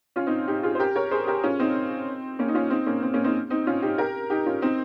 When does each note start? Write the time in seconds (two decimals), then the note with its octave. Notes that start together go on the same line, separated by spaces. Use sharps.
0.16 C#4 F4
0.27 C4 D#4
0.48 D#4 G4
0.63 F4 G#4
0.75 C5
0.79 G4 A#4
0.96 A#4 C#5
1.11 G#4 C5
1.27 G4 A#4
1.43 C#4 F4
1.59 C4 D#4
2.39 A#3 C#4
2.48 D#4
2.55 C#4 F4
2.70 C4 D#4
2.86 A#3 C#4
3.03 C4
3.14 A#3 C#4
3.24 C4 D#4
3.50 C4 D#4
3.67 C#4 F4
3.82 D#4 G4
3.98 G4 A#4
4.30 D#4 G4
4.46 C#4 F4
4.62 C4 D#4